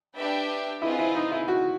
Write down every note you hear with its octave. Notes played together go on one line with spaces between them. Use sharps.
D4 G4 B4 E5 G5
C4 E4 F4 G#4 B4 D#5
E4
D#4
E4
F#4